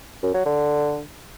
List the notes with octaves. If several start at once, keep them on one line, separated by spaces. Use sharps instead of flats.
F#2
F#3
D3